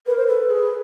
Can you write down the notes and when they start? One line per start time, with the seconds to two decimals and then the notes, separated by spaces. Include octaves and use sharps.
0.07 A#4 B4
0.17 C5
0.28 A4 B4
0.50 G#4